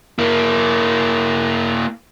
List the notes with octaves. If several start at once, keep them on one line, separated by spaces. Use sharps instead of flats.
A#3 E4